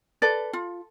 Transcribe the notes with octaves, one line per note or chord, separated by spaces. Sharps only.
A4 B4 D5
F4